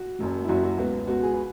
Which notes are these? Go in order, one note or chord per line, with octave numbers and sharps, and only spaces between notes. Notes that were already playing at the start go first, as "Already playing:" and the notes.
Already playing: F#4
F#1 F#2 F#3
E4
F#1 F#2 F#3 F#4
F#4
C#2 B2 B3
C#2 B2 B3 F#4
G#4
B4